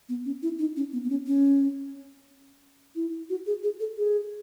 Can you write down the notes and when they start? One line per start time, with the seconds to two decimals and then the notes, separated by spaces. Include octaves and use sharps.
0.09 B3
0.25 C#4
0.43 E4
0.59 D#4
0.76 C#4
0.93 B3
1.04 B3
1.10 C#4
1.27 C#4
2.96 E4
3.30 F#4
3.46 G#4
3.63 G#4
3.80 A4
3.97 G#4